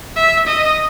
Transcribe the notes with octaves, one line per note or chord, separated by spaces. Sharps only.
E5
D#5